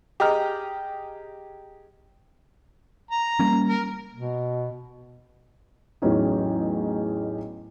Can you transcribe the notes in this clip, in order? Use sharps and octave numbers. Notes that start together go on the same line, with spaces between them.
G4 G#4 D#5 A#5 F6
A#5
G3 A#3 C#4
A#4
B2
A1 E2 F#3 B3 C#4 D#4